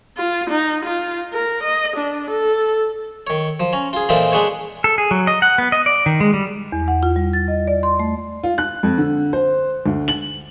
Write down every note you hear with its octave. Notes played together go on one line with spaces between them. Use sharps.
F4
D#4
F4
A#4
D#5
D4
A4
D#3 C#5
F3
C#4 A#5
F4 G#4
A#2 E3 C4 D#4 F4 A4
G#3 D4 D#4 G#4 B4 C#5
A4
G#4
F#3
D#5
F#5
B3
D#5
D5
D#3
G#3
G3
E2
F#5
F4
G3
A6
D#5
D5
C6
A3
F4
F#6
F2
D3
C5
D2
F#7